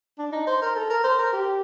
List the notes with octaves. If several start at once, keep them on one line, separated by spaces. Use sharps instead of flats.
D4
D#4
C5
A#4
A4
A#4
C5
A#4
G4